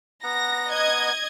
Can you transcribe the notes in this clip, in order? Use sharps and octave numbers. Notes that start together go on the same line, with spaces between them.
B3 F#5 A#5 A#6
D#5 G#6